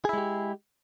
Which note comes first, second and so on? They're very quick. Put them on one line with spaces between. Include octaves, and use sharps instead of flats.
G#4 E4 G#3 G4